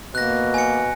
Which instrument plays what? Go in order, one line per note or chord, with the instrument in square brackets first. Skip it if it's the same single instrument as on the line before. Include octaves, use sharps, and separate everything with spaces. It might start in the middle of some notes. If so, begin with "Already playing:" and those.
[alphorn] B2 [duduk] A#3 [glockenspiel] F#6 A#6
[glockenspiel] G#5 C#7